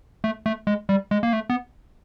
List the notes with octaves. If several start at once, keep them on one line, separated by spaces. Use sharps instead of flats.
A3
A3
G#3
G3
G#3
A#3
A3
B3